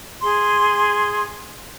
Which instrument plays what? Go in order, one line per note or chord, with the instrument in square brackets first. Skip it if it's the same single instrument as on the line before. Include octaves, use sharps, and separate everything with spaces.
[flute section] G#4 C6